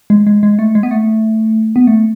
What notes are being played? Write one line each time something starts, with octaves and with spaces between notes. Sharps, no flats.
G#3
G#3
G#3
A3
G#3
B3
A3
B3
A3